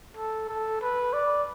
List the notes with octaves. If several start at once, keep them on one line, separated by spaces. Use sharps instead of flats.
A4
A4
B4
D5